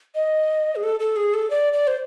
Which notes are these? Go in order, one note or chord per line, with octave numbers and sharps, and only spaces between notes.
D#5
G#4
A4
A4
G#4
A4
D5
D5
C5